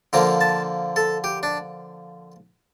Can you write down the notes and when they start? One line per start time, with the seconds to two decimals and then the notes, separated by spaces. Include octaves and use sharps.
0.13 D3 F3 A#3 A#5
0.41 A5
0.96 A4
1.24 G4
1.43 D4